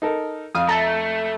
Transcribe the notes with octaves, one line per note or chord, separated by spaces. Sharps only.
D#4 A4 A#4
F2 F5 D#6
A3 E5 A5 A#5